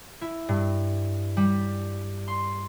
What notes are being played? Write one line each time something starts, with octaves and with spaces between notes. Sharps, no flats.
E4
G2
G3
C6